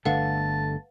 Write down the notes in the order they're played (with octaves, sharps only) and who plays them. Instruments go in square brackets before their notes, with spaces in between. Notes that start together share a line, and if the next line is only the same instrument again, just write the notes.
[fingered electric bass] G1 D3 A3 [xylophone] B4 F5 F#5 [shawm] A5